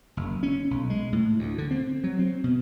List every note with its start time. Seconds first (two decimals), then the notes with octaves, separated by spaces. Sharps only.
0.17 F#1
0.43 C#4
0.71 B1
0.90 G#3
1.13 A2
1.39 D2
1.58 D3
1.71 C4
2.04 F#3
2.19 C4
2.44 B2